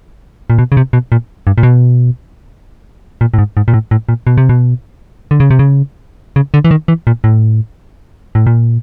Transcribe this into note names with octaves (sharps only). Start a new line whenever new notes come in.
A#2
B2
C#3
C3
B2
A#2
G2
A#2
B2
A#2
A2
G#2
G#2
A#2
A2
A2
A#2
B2
C3
B2
D3
C#3
C3
C#3
C#3
D3
E3
D#3
E3
A#2
A2
A2
A#2